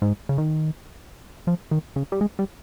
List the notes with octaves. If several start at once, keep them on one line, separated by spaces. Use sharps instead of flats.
G#2
C#3
D#3
F3
D#3
C#3
G3
G#3
G3